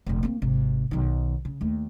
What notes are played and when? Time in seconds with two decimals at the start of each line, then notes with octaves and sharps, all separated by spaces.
0.06 F1 A#1
0.23 A#3 C4
0.42 G#1 C3
0.91 B1 D#3
1.45 C#3
1.61 D#2 A3